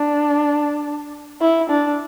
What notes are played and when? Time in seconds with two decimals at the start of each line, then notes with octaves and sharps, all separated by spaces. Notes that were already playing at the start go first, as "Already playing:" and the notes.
Already playing: D4
1.42 E4
1.70 D4